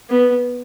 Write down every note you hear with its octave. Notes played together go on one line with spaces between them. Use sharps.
B3